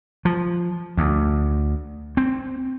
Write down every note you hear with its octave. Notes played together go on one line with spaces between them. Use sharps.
F3
D2
C4